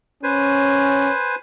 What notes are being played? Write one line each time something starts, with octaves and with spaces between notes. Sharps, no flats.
C#4 B4 C5 G#5